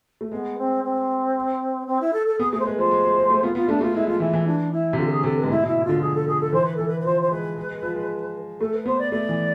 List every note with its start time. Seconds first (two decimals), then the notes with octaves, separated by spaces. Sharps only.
0.21 A3
0.32 G#3 B3
0.58 C4
0.84 C4
1.87 C4
2.01 E4
2.13 A4
2.26 A4
2.39 B3 G#4
2.52 A3 G#4
2.59 C5
2.65 G#3 B4
2.78 F3 C5
2.91 G#3
3.04 G#3
3.17 G#3
3.30 A3
3.43 B3 F4
3.55 B3 F4
3.68 A3 D4
3.81 A3 F4
3.94 G#3 E4
4.07 F3 F4
4.19 E3 E4
4.33 E3
4.46 D4
4.72 E4
4.93 C3
4.98 D3 F4
5.06 A4
5.11 G#4
5.24 C3 A4
5.37 B4
5.43 G#2
5.49 A2 E4
5.62 B2
5.67 E4
5.84 D3 F4
6.01 F3 G#4
6.15 A4
6.27 F3 G#4
6.40 A4
6.53 E3 C5
6.65 B4
6.76 E3 A4
6.87 B4
7.00 B4
7.05 F3 C5
7.21 C5
7.31 G#3 B4
7.57 G#3
7.70 G#3
7.83 F3
7.95 G#3
8.60 A3 A4
8.74 B4
8.86 B3 C5
8.99 D5
9.12 A3 D5
9.29 E3